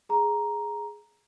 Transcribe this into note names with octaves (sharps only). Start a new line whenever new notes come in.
G#4 A#5